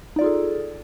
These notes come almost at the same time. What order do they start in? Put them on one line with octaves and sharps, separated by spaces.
D#4 D5 F4 G#4 A4